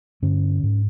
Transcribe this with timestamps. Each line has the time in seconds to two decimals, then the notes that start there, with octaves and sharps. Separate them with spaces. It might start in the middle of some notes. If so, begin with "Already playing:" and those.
0.22 G2 D3 C#4
0.63 G#2